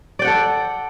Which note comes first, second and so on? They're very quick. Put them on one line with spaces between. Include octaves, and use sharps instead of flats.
D5 G5 F#5 A4